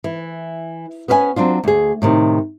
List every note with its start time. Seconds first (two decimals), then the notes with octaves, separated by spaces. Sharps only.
0.04 E3
1.08 B3 C#4 B4 F5 G#5
1.36 F#3 C4 D4 F4
1.64 D2 G#4
2.02 A2 C3 D#3